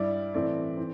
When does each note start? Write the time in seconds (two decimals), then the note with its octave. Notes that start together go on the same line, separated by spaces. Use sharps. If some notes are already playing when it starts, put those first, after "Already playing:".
Already playing: G2 G3 E4 D5
0.34 A2 E3 A3 C4 E4 D5
0.77 E3 C4